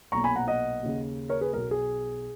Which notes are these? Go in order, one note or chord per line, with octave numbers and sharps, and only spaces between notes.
B1 A#2 A#5 C#6
G#5 B5
F#5 A#5
D#5 F#5
D#2 C#3
A#4 C#5
G#4 B4
B1 B2 A#4
G#4